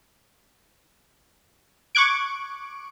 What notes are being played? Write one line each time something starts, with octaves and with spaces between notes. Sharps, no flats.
C#6 D6 F#6 G#6 D7